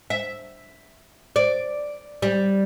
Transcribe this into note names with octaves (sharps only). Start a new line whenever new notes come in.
E5
D5
G3